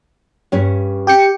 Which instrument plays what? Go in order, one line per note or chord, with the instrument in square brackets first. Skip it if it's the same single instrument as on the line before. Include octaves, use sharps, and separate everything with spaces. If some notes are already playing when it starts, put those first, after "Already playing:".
[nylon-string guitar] G2 C#4 C#5
[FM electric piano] G4 G5 C#7